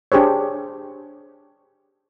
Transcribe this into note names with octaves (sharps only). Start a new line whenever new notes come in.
D4 G4 G#4 C5 C#5